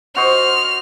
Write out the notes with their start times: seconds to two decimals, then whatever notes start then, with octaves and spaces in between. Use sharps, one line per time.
0.16 F#4 C5 D#5 F6